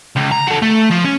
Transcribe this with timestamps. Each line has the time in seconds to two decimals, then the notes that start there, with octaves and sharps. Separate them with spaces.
0.16 C#2
0.32 A#5
0.48 F#4 A4
0.63 A3
0.91 F3
1.04 C#4